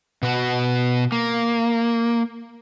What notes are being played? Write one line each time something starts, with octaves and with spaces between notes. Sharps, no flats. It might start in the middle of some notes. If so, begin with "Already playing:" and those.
B2 F#4
A#3